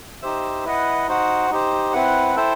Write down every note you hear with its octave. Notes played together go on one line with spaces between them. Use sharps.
D#4 G4 C5 E5
E4 B4 D#5 F#5
D#4 F#4 C5 F#5
D#4 G4 C5
C4 E4 B4 F#5
E4 A4 C5 E5 G5